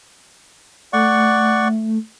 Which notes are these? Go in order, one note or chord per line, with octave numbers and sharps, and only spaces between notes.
A3 D5 F#5 C#6